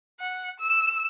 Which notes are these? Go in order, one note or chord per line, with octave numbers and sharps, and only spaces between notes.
F#5
E6